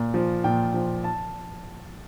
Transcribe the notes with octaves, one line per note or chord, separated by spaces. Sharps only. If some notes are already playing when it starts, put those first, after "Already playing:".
Already playing: A#2
F3
A#2 G5
F3
A5